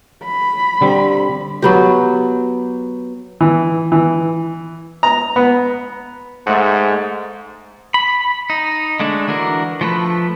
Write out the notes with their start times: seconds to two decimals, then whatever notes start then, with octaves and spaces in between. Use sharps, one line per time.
0.24 B5
0.81 D3 G3 C4
1.62 F#3 B3 G4
3.41 E3
3.92 E3
5.03 A#5
5.36 B3
6.47 G#2 A3 F#5
7.94 B5
8.50 D#4
9.00 D3 G#3 A3 D4
9.28 E3 D4 F#4 A#4
9.81 F3 A3 B4